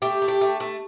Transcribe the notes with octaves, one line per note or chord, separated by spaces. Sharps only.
A3 G4
A3
G4
A3
A3